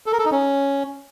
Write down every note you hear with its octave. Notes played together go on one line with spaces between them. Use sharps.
A4
A#4
A4
D#4
C#4